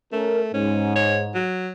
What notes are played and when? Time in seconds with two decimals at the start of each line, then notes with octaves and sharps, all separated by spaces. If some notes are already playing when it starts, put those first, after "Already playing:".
0.13 A3 C#4 A#4
0.54 G#2 C#4
0.96 C#5
1.35 F#3